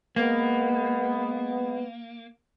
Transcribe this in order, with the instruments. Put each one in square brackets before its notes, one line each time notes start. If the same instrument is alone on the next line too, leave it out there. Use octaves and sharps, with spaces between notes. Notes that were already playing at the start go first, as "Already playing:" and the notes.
[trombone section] G#3 B3 [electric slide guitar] A#3